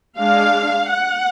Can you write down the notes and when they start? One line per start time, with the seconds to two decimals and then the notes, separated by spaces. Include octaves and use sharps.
0.17 G#3 D4 F5
0.88 F#5